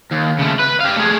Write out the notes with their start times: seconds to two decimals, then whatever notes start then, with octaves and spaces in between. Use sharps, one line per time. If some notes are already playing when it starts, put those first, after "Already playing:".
0.11 D#2
0.39 C#3 A3
0.59 B4
0.81 G4 F5
0.97 A3 G#4